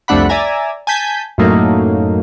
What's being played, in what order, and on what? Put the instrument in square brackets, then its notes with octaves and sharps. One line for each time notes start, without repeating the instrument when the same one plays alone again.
[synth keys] C2 F2 A3 D4 F#5 B5
D5 E5 G#5 A#5
G#5 A5 G6 B6
F#2 A2 F#3 A3 A#3 D#4